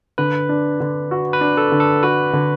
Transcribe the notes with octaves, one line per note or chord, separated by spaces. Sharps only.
D3 B4
D4
D3
F#4
B4
D4
A4
D3
A4
F#4 B4
D3